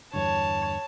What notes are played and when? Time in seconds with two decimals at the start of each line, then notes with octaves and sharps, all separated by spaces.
0.13 E2 G2 D3 C#5 A5